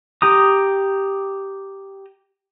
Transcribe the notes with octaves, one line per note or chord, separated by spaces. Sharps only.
G4 A#5 D#6